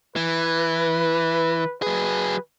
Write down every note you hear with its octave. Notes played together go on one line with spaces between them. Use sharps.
E3 B4
F#3 G#4 B4